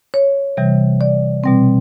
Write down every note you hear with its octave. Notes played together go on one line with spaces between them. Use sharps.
C#5
C3 E3 G3
D5
B2 G3 C4